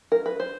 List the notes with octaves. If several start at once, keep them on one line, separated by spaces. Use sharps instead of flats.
A#4
B4
C5